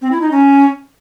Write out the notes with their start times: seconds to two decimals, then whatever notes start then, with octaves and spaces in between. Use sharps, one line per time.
0.02 C4
0.12 E4
0.21 D#4
0.31 C#4